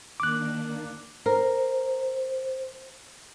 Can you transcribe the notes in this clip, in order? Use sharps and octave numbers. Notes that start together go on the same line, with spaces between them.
D#3 A#3 D4 D6 F#6
A#4 C5